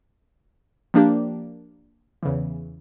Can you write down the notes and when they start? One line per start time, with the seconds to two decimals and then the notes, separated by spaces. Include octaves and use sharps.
0.94 F3 A#3 D4 G4
2.23 E2 C#3 E3